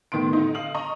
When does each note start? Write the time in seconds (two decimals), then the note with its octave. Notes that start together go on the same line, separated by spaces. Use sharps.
0.12 A2 D#3 B3 C6 D7
0.33 D3 D#4
0.55 F5 D#6 F#7
0.74 D#5 A#5 C#6 D#6